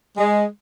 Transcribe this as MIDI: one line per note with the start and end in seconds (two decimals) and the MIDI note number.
0.18 0.45 56